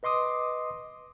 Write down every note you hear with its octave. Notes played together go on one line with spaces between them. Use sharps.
B4 D#5 C6 D6 D#6